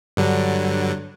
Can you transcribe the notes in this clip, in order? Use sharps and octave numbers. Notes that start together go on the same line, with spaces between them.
G2 D3 F#3